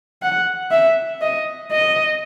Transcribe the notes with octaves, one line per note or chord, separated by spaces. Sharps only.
F#5
E5
D#5
D#5